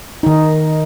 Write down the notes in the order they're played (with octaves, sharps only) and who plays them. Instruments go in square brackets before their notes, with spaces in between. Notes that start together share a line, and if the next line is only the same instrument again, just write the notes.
[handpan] D#3 D#4